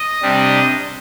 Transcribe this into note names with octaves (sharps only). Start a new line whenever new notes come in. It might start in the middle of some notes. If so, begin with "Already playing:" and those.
Already playing: D#5
C3 G3 D4